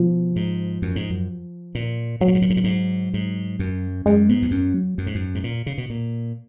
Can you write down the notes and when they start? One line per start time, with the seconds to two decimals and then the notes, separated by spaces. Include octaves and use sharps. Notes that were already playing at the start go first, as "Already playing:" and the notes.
Already playing: B2 F3
0.36 G#2
0.82 F#2
0.96 G#2
1.10 F#2
1.75 A#2
2.21 G#2 F#3
2.28 A#2
2.34 G#2
2.42 A#2
2.50 G#2
2.57 A#2
2.64 G#2
3.14 G#2
3.59 F#2
4.06 F#2 G#3
4.29 G#2 B3
4.42 F2
4.51 F#2 C#4
4.74 F#3
4.98 F#2
5.07 G#2
5.15 F#2
5.35 G#2
5.44 A#2
5.66 C#3
5.78 B2
5.90 A#2